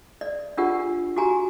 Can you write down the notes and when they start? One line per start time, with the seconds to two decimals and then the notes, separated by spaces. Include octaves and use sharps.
0.21 D5
0.57 D4 F4 G4 A#4 F#5
1.16 F#4 G4 G#5 A#5